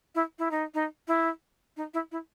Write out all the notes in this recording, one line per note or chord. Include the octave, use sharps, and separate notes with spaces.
E4
E4
D#4
D#4
E4
D#4
E4
E4